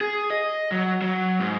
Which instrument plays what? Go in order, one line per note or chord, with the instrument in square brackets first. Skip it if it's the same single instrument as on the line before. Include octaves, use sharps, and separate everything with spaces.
[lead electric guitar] G#4
D#5
F#3
F#3
G#2